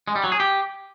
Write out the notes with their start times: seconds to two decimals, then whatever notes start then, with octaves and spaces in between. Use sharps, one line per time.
0.08 G#3
0.16 G3
0.24 F#3
0.32 G#4
0.40 G4